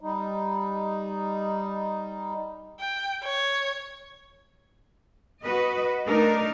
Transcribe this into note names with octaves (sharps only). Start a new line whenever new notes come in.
G3 D#4
G5
C#5
F#4 B4 D#5
A3 D4 D#4 A#4